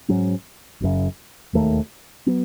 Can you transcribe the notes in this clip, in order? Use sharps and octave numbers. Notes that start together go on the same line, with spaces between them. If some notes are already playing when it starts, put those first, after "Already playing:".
G#2 F#3 C#4
F#1 F#2 C#3
E1 D#2 D#3 A3
F#3 B3